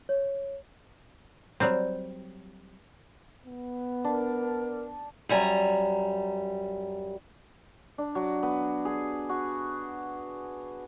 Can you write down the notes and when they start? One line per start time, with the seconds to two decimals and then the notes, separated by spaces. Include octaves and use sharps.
0.09 C#5
1.60 F#3 G3 C4
3.46 B3
4.04 D4 A#4
5.29 F#2 G3 G#5 A#5
7.98 D4
8.15 F#3
8.43 B3
8.85 G#4
9.29 F#4